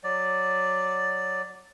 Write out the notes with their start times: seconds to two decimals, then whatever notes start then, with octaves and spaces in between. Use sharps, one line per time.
0.04 F#3 D5